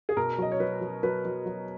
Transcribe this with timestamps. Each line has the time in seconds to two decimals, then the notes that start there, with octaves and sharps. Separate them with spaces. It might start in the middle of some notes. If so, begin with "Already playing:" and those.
0.09 G#4
0.17 B2 A#4
0.38 F#3 D#5
0.52 C#5
0.60 F#3 B4
0.81 F#3
1.03 F#3 B4
1.25 F#3
1.46 F#3